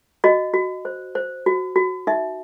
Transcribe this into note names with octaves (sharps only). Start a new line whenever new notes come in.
F#4 D#5
F#4
C5
C5
F#4
F#4
D#4 E5